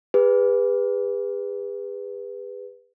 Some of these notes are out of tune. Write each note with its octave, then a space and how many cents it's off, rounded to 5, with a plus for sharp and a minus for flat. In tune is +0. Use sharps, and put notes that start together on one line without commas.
G#4 -45 B4 +0